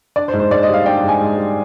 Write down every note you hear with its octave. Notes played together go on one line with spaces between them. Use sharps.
D4 D5
C5
G#2
C5
G#2 D5
D#5
G3 F5
D4 G5
G5
G#2
G#5
G#2
G3